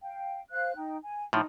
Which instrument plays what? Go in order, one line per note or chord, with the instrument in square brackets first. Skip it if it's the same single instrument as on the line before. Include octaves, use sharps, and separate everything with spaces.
[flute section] F5 G5
C5 F5 F#6
D#4 G5
G#5
[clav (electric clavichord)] A2 F3 [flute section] D#4